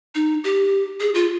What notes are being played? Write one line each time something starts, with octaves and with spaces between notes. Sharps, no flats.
D#4
G4
G#4
F4